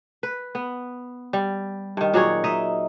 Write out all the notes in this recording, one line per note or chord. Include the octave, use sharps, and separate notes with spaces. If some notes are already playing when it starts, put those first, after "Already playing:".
B4
B3
G3
G2 D#3
A#2 F#3 G#4 C#5
D#4 D#5 E5